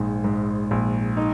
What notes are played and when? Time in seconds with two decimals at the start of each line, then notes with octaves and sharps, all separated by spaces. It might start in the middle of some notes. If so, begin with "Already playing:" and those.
Already playing: A#1 G#2
0.24 G#2
0.71 A#1
1.17 D#4